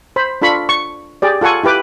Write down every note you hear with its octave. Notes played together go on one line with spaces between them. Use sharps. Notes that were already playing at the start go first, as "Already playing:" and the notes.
C5 B5
D4 F4 A4 B5 C#6
C#6
G4 G#4 D5
F4 A4 F#5 G#5 C#6
E4 G4 B4 D6